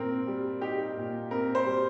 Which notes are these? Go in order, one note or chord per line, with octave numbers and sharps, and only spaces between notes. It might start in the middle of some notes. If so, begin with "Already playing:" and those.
Already playing: A#2 C4 A#4
G3
D#4 G4
A#2
C4 A#4
C5
G3